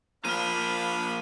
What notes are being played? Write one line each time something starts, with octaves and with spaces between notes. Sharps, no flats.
F3 A#3 D4 F4 F5 B5 F6 D#7